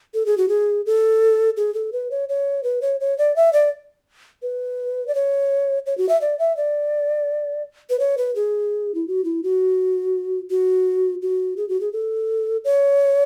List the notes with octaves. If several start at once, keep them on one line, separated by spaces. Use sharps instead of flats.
A4
G#4
F#4
G#4
A4
G#4
A4
B4
C#5
C#5
B4
C#5
C#5
D5
E5
D5
B4
D5
C#5
C#5
F#4
E5
D5
E5
D5
B4
C#5
B4
G#4
E4
F#4
E4
F#4
F#4
F#4
G#4
F#4
G#4
A4
C#5